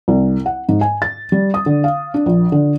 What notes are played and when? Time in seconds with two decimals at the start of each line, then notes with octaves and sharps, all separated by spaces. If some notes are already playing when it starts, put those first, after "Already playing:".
0.08 C2
0.46 F#5
0.69 G#2
0.81 G#5
1.02 A6
1.32 G3
1.54 D#6
1.66 D3
1.84 F5
2.14 D4
2.26 A#1
2.52 D3